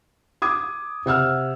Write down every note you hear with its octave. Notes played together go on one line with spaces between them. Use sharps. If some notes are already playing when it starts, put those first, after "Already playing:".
D6 D#6 G#6
C3 F#5 E6 F6